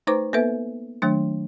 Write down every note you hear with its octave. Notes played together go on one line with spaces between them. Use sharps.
A3 D#4 B4 C5 A#5 D6
A#3 B3 A4 B4 E5
D#3 F#3 A3 D4